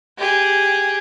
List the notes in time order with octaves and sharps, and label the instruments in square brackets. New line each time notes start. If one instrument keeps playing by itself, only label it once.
[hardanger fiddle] G4 G#4